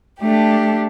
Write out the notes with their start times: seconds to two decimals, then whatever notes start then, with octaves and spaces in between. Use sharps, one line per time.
0.20 A3 D4 G4